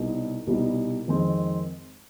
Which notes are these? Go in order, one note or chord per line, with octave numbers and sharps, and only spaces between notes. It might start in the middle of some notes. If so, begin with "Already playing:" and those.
Already playing: C2 B2 G3 B3 D#4
C2 B2 G3 B3 D#4
F2 D#3 G#3 C4